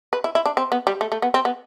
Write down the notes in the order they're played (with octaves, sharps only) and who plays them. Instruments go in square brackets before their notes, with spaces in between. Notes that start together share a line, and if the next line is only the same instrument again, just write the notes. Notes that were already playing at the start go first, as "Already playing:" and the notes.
[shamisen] B4
E4
E4
D4
C4
B3
G3
A3
A3
B3
C4
B3